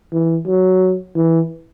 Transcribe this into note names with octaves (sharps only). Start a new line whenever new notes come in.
E3
F#3
E3